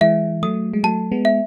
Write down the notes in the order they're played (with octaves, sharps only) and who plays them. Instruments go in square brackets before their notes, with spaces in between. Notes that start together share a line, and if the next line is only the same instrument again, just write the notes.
[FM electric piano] E3 G#3 [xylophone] E5
[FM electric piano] F#3 A3 [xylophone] D#6
[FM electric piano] G#3
[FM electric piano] F#3 A3 [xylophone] A5
[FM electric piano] G#3 B3
[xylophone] E5